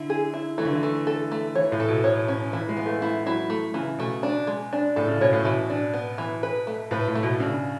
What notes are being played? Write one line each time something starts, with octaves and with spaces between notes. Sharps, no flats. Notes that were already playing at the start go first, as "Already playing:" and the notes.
Already playing: D3 E4
G#4
E4
E3 A3
D3
E3
A3
A4
A3
E3 C#5
A2
A4
B2
C#5
C#4
E3 E4
G#3
B3
A3
A3 E4
F#3 E4
A3
C#3 E3
B2 A3
D4
G#3
D4
A2 A4
C#3
B2 C#5
A2
B2 E3
D4
B3
E3
B4
A3
A2 B4
A2
A3
B2
C#3 D4